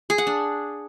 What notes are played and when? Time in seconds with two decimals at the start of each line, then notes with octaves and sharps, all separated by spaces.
0.10 G#4
0.18 F#5
0.27 D4